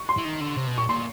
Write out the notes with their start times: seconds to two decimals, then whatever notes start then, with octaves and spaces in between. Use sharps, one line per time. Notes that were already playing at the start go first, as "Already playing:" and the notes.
Already playing: C#6
0.09 C6
0.17 E3
0.25 D#3
0.40 D3
0.56 C3
0.67 B2
0.78 A#2 C#6
0.88 A#2 C6